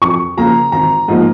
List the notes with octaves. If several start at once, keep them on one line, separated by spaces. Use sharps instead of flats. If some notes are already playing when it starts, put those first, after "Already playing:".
F2 C#6
C#3 F3 A#3 A#5
G#1 A#5
G#2 F3 A#3